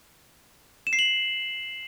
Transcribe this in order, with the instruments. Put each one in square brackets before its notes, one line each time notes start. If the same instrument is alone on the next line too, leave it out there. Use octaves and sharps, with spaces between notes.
[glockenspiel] E7
C7
F#7